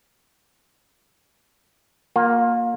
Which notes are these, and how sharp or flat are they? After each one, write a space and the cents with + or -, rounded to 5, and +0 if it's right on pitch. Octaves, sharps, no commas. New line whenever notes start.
A#3 +0 F4 +30